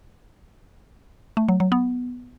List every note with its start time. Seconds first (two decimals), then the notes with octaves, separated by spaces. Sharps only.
1.37 A3
1.49 F#3
1.60 F#3
1.72 B3